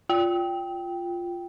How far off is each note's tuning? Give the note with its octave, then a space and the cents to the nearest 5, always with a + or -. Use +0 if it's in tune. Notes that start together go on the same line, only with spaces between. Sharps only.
F4 +0 G5 +0